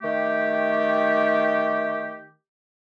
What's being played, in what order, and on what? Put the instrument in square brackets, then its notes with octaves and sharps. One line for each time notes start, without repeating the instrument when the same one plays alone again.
[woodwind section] D#3 A3 G4